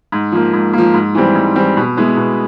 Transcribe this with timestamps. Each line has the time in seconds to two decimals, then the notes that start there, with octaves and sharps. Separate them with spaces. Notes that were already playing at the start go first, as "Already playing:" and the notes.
0.12 G#2
0.32 F3 A#3
0.53 G#2
0.73 F3 A#3
0.94 G#2
1.15 E3 G3 C4
1.35 G#2
1.56 E3 G3 C4
1.77 B2
1.97 G#3 B3 E4
2.17 B2